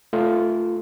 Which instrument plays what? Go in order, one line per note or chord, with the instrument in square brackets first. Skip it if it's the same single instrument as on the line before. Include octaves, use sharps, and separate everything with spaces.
[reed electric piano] A3 F4